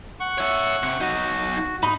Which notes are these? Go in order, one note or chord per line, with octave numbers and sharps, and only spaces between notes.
F#5 C#6
C#5 E5
C3
B1 D#4 F#4
D#4 B5